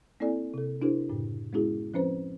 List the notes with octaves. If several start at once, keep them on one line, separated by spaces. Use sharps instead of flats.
A#3 C4 E4 A4 D5 G#5
C3 A4
D4 E4 F#4 G#4 A#4 C5
F#2 A2 C#3
G#3 B3 C#4 E4 F#4 G#4
F3 C4 C#4 B4 C5 A#5